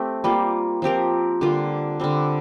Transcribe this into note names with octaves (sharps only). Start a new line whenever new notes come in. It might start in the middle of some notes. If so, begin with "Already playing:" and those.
Already playing: A3 C4 G4
G3 A#3 F4 A#4
F3 C4 G4 A#4
D3 G3 A#3 F4
D3 G3 C4